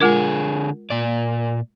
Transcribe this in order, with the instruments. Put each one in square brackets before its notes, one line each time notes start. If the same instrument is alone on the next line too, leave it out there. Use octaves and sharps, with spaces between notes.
[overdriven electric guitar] D3 G#4 [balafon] G#3 F4 A#4
[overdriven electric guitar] A#2 D5